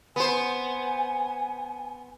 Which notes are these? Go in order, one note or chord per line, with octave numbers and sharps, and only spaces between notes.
B3 C5 G#5